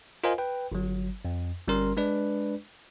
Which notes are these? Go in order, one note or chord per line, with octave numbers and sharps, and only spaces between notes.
F4 A#4 C5 D#5 F5 G#5
B4 G5
G1 F#3
F2
G1 G3 C#4 A#4 C6
G#3 D4 B4 D5